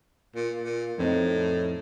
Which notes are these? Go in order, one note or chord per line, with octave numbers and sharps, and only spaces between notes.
A#2
A#2
F2 A2 C4 D#4